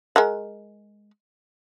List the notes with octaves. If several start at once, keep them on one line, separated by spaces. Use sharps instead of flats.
G#3 A#4 F#5